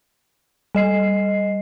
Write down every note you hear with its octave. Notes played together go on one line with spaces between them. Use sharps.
G3 D#5 C7